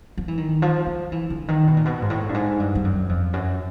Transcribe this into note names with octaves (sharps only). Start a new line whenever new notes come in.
F3
E3
D#3
F3
F3
E3
D3
D#3
B2
A#2
B2
G#2
A2
G2
G#2
G2
G2
F#2
F2
F#2